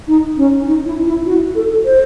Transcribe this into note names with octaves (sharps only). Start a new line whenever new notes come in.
D#4
C#4
D#4
E4
E4
F#4
A4
C5